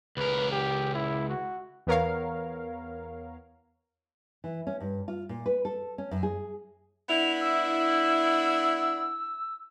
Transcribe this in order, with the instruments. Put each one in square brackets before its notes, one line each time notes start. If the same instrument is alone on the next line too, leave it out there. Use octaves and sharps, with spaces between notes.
[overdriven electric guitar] C#2 A#4 [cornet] B4
[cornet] G4
E4
F#4
[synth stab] E2 B3 A#4 C#5 F5
[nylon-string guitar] E3
C#4
G2
F4
A#2
B4
A4
C#4
F#2
G#4
[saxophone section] B3 D4 E4 [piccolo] F7
[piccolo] E6